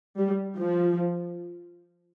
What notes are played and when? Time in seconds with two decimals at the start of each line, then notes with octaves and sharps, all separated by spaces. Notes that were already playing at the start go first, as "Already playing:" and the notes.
0.18 G3
0.59 F3